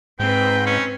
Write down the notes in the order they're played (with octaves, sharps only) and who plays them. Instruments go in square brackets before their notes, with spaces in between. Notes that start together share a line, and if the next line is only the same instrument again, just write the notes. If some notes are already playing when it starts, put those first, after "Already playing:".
[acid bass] G#2 [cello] C4 B4 [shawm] G5
[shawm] C#4